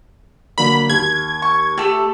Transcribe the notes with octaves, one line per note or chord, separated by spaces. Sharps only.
D3 F#3 A#3 B5
D#2 G#6
C#6
A3 G4 A4